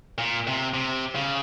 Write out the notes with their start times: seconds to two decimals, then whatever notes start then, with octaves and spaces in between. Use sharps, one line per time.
0.18 A#2
0.47 C3
0.74 C3
1.15 C#3